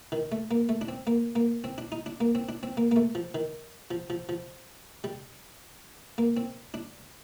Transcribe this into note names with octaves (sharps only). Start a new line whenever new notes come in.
D#3
A3
A#3
A3
D4
C4
A#3
A#3
C4
D4
D#4
D4
A#3
C4
D4
C4
A#3
A#3
A3
F3
D#3
F3
F3
F3
G3
A#3
C4
D4